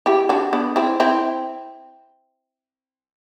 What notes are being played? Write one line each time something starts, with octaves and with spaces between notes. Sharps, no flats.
E4 G4
D4 F#4
B3 D4
C4 E4
C4 E4